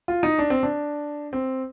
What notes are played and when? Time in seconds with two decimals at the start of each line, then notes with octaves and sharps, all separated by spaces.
0.08 F4
0.23 D#4
0.38 D4
0.50 C4
0.63 D4
1.33 C4